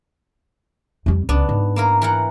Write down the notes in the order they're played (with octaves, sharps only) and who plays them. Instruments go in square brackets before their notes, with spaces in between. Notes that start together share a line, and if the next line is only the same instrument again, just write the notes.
[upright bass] F2 G3
[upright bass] C#2 [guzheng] B3 D4
[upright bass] G#2
[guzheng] A#3 E4 A#4
E3 A#4 F#5